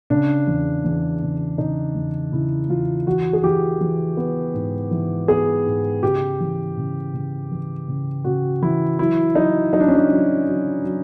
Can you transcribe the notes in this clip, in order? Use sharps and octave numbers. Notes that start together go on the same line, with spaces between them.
C#3 D4
E2
E2
C#3
C#3 D#4
E2
C#3 E4
E2 F4
E3 F#4
G#4
E3 G4
E3
B3
G#2
E3
B3 G#4
G#2
C#3 G4
E3
C#3
C#3
E3
C#3
C#3 F#4
E3 E4
F#3 E4
F#3 D#4
F#3 D#4
D4
C#4
D4
F#3
F#3
F#3